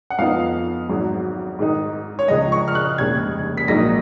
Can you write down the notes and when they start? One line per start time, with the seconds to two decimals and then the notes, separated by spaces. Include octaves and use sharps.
0.10 F#5
0.18 F2 F3 B3 D#4 F5
0.89 G#1 G#2 F#3
1.59 G#2 D#3 G#3 D#4
2.19 C#5
2.28 C#2 C#3 F3 D#5
2.52 C#6
2.68 F6
2.75 F#6
2.98 F1 D#2 C#3 G#3 G#6
3.57 B6
3.68 A#1 G#2 F#3 A#3 D#4 A#6